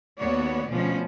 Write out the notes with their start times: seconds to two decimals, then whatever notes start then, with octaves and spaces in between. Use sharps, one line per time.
0.19 D#2 B3 F#4 C#5 D5
0.70 D2 B2 F3 C#4